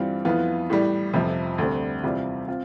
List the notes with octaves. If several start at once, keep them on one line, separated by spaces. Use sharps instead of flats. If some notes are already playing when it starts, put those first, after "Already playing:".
Already playing: G2 E3 G3 C4 F4
F2 E3 B3 F4
A2 E3 G3
F1 F2 C3 F3 C4
D2 D3 G3 C4
E2 C3 G3 C4 F4
C4 F4